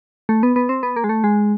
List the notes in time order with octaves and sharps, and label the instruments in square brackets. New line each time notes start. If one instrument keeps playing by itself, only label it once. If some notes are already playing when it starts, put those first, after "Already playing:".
[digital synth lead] A3
B3
B3
C4
B3
A#3
G#3
A3
G#3